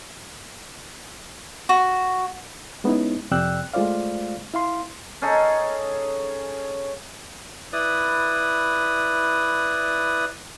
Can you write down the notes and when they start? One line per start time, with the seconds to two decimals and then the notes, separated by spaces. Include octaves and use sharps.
1.69 F#4
2.84 G#3 B3 C#4 D#4 E4
3.31 F2 C3 D5 G5 E6 F#6
3.74 G#3 A3 F4 C5 D5 F5
4.54 E4 F5 C6
5.22 C#4 D#4 G#4 A4
7.73 E4 B4 D5 D#6